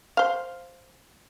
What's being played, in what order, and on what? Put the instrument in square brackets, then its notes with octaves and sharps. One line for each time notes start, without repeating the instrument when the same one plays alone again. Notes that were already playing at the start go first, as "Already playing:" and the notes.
[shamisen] C5 F5